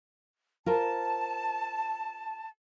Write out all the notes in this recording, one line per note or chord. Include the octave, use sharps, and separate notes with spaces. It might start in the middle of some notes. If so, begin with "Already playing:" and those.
F4 A#4 C5 A5